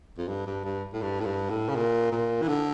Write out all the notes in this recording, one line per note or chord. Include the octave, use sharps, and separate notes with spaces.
F2
G2
G2
G2
A2
G2
A2
G2
A2
C#3
A#2
A#2
E3
D3